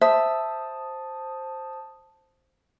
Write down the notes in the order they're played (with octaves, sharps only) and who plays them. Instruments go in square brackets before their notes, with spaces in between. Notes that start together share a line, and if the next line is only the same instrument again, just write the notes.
[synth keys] C5 A5 D#6 [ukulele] E5